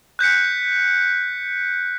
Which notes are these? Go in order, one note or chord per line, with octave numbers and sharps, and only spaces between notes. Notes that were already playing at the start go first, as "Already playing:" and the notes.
F#6 G6 B6 C#7